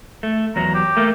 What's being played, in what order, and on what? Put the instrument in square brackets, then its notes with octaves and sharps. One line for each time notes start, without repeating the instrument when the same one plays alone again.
[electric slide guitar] A3
[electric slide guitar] E2 F#3 [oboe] A#5
[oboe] G4
[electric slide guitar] A3 A#3